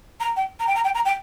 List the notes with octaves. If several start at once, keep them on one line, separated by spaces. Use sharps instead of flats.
A#5
G5
A#5
G5
A#5
G5
A#5
G5